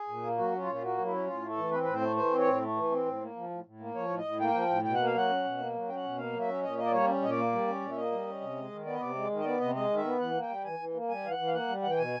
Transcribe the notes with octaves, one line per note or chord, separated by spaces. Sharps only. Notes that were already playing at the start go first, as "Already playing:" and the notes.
Already playing: G#4
A#2
A#3
F#3 F#4
C#4
F4
A#2
F4
A#3 F#4
F#3
E4
C#4
A2 F4
A3
A4
E3
C4 B4
A2 B4
C5
A3
E3 C5
C4
C#5
A2
A3
E3
C4
A2
A#3
F3
A2
A2
A#3
F3 C#5
A2
D#5
A2
A#3 G5
F3
A2
B2 G5
A#3 F#5
F5
F#3 F#5
C#4
B2
A#3
F#3
C#4 G5
F#5
B2
A#3 F5
F#3
E5
C#4
A#2 D#5
A#3 D#5
D5
G3 C#5
C#4
A#2 D#5
D5
A#3
G3
C#4
A#2
E5
A#3 D#5
G3
C#4
C3
G#3
D#3
B3 D5
D#5
C3 D5
G#3
D#3
D#5
B3 D5
C3 D#5
G#3 D#5
D#3
E5
B3
E3 F#5
A#3
G5
G3
E3 G#5
E3
A#3
G3 G#5
E3 F5
F#5
E3
F5
A#3 F#5
G3
E3 F#5
G5
B2 G#5